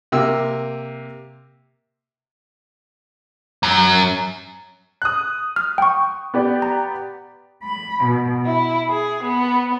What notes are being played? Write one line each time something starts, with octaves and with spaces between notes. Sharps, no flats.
C3 A#3 E6
F#2
D#6 F#6
F6
G5 C#6
B3 G4 D5
A#5
B5
B2
E4
G#4
B3